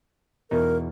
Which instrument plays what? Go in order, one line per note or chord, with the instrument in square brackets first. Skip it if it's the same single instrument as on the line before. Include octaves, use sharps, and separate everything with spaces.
[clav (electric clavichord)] E2 B2 D#4 [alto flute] A#4